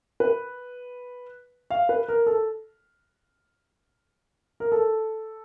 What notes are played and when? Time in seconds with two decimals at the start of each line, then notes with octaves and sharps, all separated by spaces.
0.20 B4
1.70 F5
1.89 B4
2.09 A#4
2.27 A4
4.60 A#4
4.72 A4